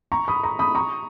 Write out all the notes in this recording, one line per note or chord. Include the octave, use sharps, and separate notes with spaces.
A#5 C#6
B5 D#6
A#5 C#6
B5 D#6
A#5 C#6